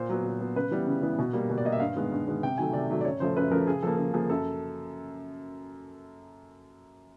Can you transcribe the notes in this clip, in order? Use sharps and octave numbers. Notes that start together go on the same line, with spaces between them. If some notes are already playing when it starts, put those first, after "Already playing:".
Already playing: A#2 C5
F#3 B3
A#2
F#3 B3
C#3 B4
E3 G3 B3
C#3
E3 G3 B3
B2
G3 A#3
B2
D5
G3 A#3 D#5
E5
G2 F5
D#3 G#3 B3
G2
D#3 G#3 B3
C3 G5
D#3 F#3 A3 G#5
C3 D5
D#3 F#3 A3
D5
F#2 C#5
C#3 F3 A3 C5
F#2 B4
C#3 F3 A3 A#4
C#3 G#4
F3 A#3 A4
C#3 A4
F3 A#3 G#4
F#2 A4